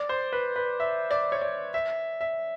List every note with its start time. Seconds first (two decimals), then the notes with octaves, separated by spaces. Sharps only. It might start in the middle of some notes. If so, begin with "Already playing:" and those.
Already playing: D5
0.09 C5
0.33 B4
0.56 B4
0.80 E5
1.11 D5
1.32 C#5
1.41 D5
1.74 E5
2.21 E5